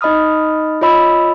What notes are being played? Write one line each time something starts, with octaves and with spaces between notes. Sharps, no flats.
D#4 D#5 B5 D#6 F6
F4 C#5 D#5 B5 E6